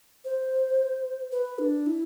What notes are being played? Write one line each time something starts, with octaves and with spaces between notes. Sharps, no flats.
C5
B4
D4
E4